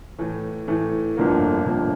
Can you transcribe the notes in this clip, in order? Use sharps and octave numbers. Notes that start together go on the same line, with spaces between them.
A2 E3 A3
A2 E3 A3
G1 F2 D3 F3 A#3
G1 F2 D3 F3 A#3